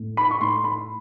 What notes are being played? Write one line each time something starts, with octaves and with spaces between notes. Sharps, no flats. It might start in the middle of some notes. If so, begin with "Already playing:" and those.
Already playing: A2
B5
C#6
A2 C6
B5